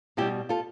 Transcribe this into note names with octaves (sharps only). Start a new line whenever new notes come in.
B2 G3 E4 G4
F4 A4